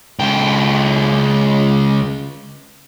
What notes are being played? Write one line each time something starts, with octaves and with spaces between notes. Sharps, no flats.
C#2 G5